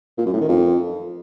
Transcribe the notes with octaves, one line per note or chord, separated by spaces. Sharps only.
A#2
F#2
A2
D#3
F2